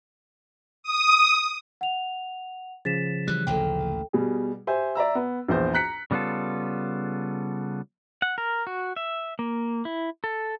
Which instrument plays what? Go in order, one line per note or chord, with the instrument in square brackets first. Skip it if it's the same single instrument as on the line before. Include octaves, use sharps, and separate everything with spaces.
[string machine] D#6
[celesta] F#5 F7
[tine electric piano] C#3 F3 [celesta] A6 B6 E7
[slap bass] E3 G3 [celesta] F#6
[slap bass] A1 D2 A#2 [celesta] A4 G5
[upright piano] B2 G3 G#4
G4 C5 E5 G#5
D5 E5 A#5 E6
B3
A#1 E2 C5
A#5 F#6 B6 C#7
[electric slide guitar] C#3 G3 B3 F4 A4
[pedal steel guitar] F#5
A#4
F#4
E5
A#3
E4
A4